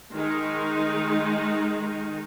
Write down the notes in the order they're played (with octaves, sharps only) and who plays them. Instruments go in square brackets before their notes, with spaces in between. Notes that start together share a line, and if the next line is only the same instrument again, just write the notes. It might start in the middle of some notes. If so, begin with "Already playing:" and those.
[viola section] D#3 G#3 D#4